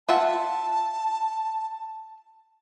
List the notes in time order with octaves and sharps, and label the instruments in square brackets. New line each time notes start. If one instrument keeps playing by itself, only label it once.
[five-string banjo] F4 E5 F#5 [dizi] A5